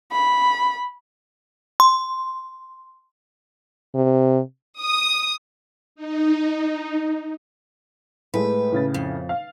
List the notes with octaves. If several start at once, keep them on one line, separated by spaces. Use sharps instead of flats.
B5
C6
C3
D#6
D#4
A2 G#3 A3 B4
A2 C#3 A6
F2
F5